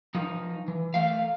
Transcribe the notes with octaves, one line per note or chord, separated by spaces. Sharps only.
F3 D#4
E3
A3 F5